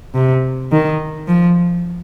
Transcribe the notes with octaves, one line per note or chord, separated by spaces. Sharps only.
C3
D#3
F3